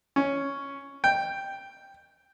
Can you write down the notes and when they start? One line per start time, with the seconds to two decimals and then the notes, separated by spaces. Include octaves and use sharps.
0.16 C#4
1.04 G5